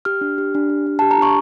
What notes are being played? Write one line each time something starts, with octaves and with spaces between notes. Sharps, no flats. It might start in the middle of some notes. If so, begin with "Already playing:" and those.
G4 F6
D4
G4
D4
G4
D4
G4 A5
A#5
D4 C#6